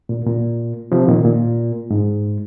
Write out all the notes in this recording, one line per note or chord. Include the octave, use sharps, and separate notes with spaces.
A#2
A#2
C3 F3
A#2 D#3
A#2
G#2